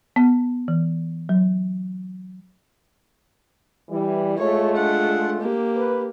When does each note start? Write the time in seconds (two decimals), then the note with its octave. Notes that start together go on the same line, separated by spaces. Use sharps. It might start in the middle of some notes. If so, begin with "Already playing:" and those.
0.16 B3
0.68 E3
1.29 F#3
3.89 E3 G3
4.38 G#3 A3 F4 C#5
4.76 D4 F#5
5.41 A#3 G4
5.76 B4